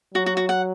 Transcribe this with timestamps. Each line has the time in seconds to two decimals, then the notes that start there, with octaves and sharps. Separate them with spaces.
0.14 F#3 F#4
0.26 F#4
0.37 F#4
0.49 F#5